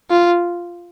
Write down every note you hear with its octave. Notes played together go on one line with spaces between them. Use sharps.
F4